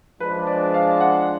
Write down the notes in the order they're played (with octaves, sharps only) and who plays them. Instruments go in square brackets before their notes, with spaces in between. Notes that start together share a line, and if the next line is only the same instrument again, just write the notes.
[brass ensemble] F3 G#3 D4 [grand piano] B4
[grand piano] D5
F5
F#5